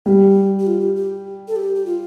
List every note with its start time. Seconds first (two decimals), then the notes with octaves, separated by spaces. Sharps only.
0.06 G3 G4
0.59 G4
0.67 F4
0.81 G4
0.96 G4
1.48 A4
1.56 G4
1.75 G4
1.86 F4